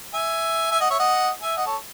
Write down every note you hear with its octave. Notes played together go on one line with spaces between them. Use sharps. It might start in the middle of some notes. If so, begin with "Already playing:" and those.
E5 G#5
E5 G#5
D#5 F#5
C#5 E5
D#5 F#5
E5 G#5
D#5 F#5
A4 C#5